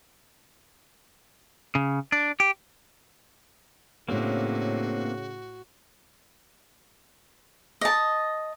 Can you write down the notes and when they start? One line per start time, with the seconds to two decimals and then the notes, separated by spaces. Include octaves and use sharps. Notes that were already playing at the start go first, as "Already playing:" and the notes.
1.75 C#3
2.12 D4
2.40 G4
4.08 A2 C#3 A#3 C4 D4 F#4
7.81 D#5 A5